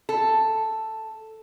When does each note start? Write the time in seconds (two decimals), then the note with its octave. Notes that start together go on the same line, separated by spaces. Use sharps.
0.09 A4